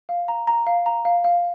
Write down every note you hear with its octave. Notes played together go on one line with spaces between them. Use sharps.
F5
A#5
A#5
F5
A#5
F5
F5